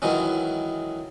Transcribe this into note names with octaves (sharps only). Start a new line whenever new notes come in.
D#3 E3 F#3 G#3 C#4